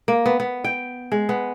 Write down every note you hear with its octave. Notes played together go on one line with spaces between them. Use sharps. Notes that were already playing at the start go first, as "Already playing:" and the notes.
A#3
B3
B3
G5
G#3
B3